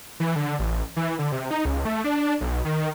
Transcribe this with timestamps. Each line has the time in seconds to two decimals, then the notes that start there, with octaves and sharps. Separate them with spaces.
0.20 E3
0.36 D3
0.59 A1
0.96 E3
1.19 D3
1.32 C3
1.51 D#4
1.65 C#2
1.85 A3
2.04 D4
2.41 B1
2.65 D#3